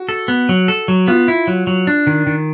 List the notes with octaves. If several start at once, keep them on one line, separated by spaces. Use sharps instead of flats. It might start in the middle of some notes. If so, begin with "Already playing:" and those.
Already playing: F#4
A4
B3
F#3
A4
F#3
B3 F4
E4
F#3
F#3
D4
D#3
D#3